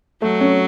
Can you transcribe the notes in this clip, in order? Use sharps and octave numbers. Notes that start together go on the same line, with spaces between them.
F#3 A3
C#4